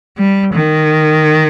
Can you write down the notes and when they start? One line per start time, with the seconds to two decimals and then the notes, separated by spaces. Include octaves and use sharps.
0.18 G3
0.54 D#3